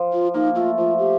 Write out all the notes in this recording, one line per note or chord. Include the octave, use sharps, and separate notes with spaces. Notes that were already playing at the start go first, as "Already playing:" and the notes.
Already playing: F3
F4
A#3 D#4
A3 F4
F3 F4
G4